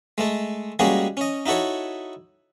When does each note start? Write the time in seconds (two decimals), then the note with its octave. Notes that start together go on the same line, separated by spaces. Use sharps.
0.18 G#3 A3 A4
0.79 G3 G#3 A#3 C#4 F#4 G#4
1.17 C#4 D#5
1.46 D#4 E4 F#4 A4 C#5